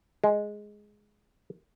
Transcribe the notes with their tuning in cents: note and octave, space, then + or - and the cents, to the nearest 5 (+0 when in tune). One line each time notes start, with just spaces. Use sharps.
G#3 +5